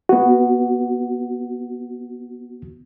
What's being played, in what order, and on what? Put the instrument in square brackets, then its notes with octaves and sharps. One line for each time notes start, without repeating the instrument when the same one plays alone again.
[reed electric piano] B3 F#4